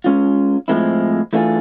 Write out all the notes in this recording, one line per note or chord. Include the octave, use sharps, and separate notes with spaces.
G#3 C#4 F4
A2 F3 G#3 C4 E4
E3 A3 D4 F4 G#4